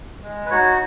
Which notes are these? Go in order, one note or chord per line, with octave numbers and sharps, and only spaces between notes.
G#3
B4
D#4 F#4 C#5